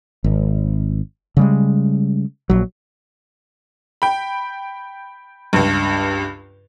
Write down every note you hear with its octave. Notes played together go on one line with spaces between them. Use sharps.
G#1
C#3 G3 G#3
A#1 F#3
G5 B5
C#2 G2